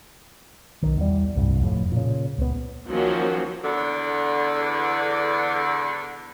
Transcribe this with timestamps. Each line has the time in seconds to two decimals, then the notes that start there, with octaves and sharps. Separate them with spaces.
0.83 B1 D#3
0.97 E2 G3
1.35 D1 C2 G2
1.62 F1 F2 A2
1.92 A#2 C#3
2.38 C#2 B3
2.89 D#3 F3 F#3 A#3 C#4 F#4
3.63 E2 D3